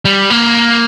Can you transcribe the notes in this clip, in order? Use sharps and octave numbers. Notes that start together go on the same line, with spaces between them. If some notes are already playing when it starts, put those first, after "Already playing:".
G3
A#3